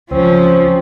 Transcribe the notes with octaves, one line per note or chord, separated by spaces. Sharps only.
C#2 F3 C4 C#4